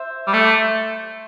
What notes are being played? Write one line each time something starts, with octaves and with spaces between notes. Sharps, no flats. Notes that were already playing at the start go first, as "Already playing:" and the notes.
Already playing: C5 E5
G3
A3